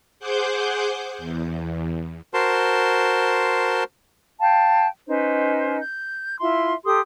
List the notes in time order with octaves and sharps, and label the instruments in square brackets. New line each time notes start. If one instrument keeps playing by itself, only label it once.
[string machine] G#4 C5 F#5 D6 G6
E2
[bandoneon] F#4 A#4 C5 A5 C6
[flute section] F5 G5 A5
C#4 D#4 B4 C5
G6
E4 F4 E5 C6
G4 A4 C6 D#6